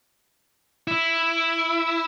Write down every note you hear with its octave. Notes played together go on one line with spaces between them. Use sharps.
E4